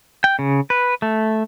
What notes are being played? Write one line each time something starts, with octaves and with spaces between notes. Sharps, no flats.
G5
C#3
B4
A3